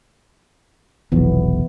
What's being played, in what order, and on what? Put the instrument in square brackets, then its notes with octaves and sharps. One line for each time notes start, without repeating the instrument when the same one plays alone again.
[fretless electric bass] F1 B1 [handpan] E3 B3